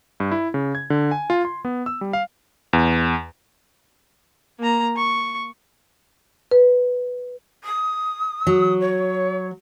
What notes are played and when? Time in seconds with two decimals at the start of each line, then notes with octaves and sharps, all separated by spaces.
0.20 G2
0.32 E4
0.54 C#3
0.75 G#6
0.90 D3
1.11 G#5
1.30 F4
1.45 C6
1.65 B3
1.86 E6
2.01 G3
2.13 F5
2.73 E2
4.59 A#3 A#5
4.97 C#6
6.51 B4
7.63 D#6
8.47 F#3
8.80 C#5